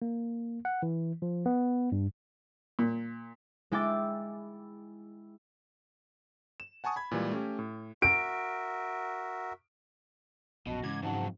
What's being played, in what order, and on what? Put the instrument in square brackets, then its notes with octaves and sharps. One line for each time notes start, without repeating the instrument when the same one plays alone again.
[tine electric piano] A#3
F#5
E3
F3
B3
G2
[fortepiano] A#2
[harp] G#3 E4 G5 D6 A6
[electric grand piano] E7
F#5 G#5 A5 C#6 D#6
B5 G#6
A#2 E3 G3 G#3
A3 C#4 G4
A2
[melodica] F#4 A#4 E5 [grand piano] D7
[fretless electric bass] A#1 F#2 [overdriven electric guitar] B2 [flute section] F#4 D#5 A5
[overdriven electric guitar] G#2 [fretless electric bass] C#3 E3 C#4 [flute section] D6 [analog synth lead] G#6
[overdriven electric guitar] F2 F#3 [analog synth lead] G#2 [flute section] F#5 A5